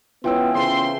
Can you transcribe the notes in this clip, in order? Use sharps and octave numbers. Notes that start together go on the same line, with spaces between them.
E3 G#3 B3 C#4 F4 G5 E6
C#3 C4 A4 C5 C6